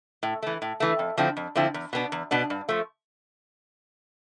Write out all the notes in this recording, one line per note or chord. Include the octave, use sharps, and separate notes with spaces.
A2
E3 A3
A2
E3 A3
F2
D3 F3 C4 E4
F2
D3 F3 C4 E4
E2
B2 B3 D4
E2
B2 B3 D4
G2
F3 A3